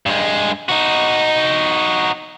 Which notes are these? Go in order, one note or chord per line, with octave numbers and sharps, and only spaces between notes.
G2 G#3
D#4 F#4